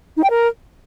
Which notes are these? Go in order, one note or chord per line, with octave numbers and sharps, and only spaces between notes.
D#4
G5
A#4